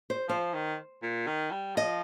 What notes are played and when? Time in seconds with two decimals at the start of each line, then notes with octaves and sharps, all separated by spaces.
0.10 C5
0.29 F3 C5
0.54 D#3
1.03 A#2
1.27 D#3
1.51 G3
1.76 F3 D#5